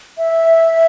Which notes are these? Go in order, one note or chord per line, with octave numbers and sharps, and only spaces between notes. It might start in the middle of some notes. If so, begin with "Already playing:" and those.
E5